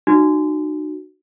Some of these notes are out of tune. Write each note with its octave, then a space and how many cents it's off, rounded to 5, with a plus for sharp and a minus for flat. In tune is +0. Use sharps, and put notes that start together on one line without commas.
D#4 -40 F#4 +0